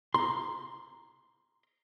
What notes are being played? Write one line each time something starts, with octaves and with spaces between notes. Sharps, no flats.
A#5 C6